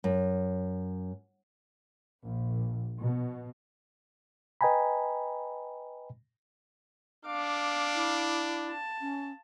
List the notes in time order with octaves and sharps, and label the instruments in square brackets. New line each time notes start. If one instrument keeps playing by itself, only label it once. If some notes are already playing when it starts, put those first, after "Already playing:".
[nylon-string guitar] F#2
[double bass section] A#1
B2
[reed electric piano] B4 D#5 G5 G#5 A#5 B5
[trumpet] D4 [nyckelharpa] F5 D6
[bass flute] E4
[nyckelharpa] A5
[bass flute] C#4